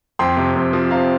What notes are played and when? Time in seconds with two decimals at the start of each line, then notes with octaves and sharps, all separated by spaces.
0.19 F2 G5 C6
0.37 C3
0.55 F2
0.73 F3
0.91 C3 F5 A#5